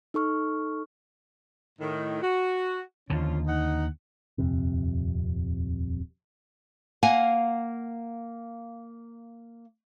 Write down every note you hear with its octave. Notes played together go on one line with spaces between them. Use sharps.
D#4 A4 C#6 F6
A2 D#3
F#4
D#2 D3 F3 C#4 F4
D#4 F#5
D#1 F2 C3
A#3 F5 F#5 G#5